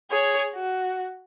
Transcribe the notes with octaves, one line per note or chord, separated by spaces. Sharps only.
G#4 C#5
F#4